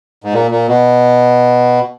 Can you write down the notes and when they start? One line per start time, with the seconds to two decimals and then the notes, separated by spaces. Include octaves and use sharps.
0.24 G#2
0.33 A#2
0.51 A#2
0.68 B2